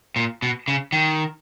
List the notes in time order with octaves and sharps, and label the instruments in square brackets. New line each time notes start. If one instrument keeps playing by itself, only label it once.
[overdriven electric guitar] A#2
B2
C#3
D#3